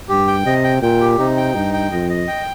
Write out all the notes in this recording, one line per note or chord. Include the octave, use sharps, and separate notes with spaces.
G2 G4
G5
C3 D#5
G5
A#2 G5
G4
C3 D#4
G5
G2 D#4
G5
F2 D#5
D#5
G5